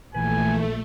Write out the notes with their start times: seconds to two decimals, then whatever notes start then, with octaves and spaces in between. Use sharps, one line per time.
0.15 A#1 E3 A3 B4 G#5